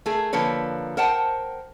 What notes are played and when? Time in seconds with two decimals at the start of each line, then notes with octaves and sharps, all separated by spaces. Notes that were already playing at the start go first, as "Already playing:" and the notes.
0.06 A3 G#4 A#4
0.33 D3 F3 A#3 B4 C#5
0.97 A#4 C5 F#5 G5 A5